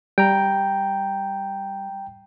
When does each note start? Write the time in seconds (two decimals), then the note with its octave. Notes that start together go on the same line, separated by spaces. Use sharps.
0.18 G3 G5 A#5